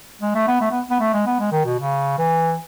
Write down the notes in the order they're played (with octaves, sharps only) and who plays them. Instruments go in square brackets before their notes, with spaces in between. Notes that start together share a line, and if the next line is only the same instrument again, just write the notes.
[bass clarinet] G#3
A3
B3
A3
B3
B3
A3
G#3
B3
G#3
D#3
B2
C#3
E3